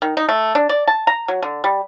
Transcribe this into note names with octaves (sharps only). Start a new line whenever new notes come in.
D#3
D#4
A3
D4
D5
A5
A#5
F#3
D3
G3